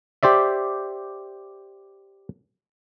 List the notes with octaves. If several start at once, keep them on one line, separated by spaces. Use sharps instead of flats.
G4 C5 D5 E5